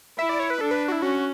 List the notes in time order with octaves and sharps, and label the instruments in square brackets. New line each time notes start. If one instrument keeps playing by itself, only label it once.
[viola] E4 [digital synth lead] E5
[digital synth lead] D5
C#5
B4
[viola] D4 [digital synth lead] A4
[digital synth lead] B4
F#4
E4
[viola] C#4 [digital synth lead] F#4